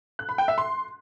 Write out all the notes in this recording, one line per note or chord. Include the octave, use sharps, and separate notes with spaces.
F#6
B5
G5
E5
C6